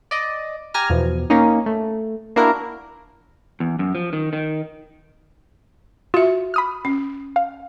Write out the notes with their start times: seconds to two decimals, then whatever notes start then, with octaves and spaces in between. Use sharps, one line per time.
0.11 D5 D#5
0.74 G4 G#5 A#5 F6
0.90 E2 B2 F3
1.30 A#3 C#4 D#4
1.66 A3
2.36 A#3 D4 E4 F#4 A#4
3.60 E2
3.79 F#2
3.95 F3
4.13 D#3
4.33 D#3
6.14 F4 F#4 E5
6.54 B5 D#6 F6
6.85 C#4
7.36 F5